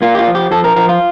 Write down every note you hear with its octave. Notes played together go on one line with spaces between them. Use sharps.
A#3 F4
G4
F4
F3
G4
F3 A4
A#4
F3 A#4
F4